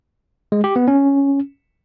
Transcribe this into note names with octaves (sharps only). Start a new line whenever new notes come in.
G#3
G4
B3
C#4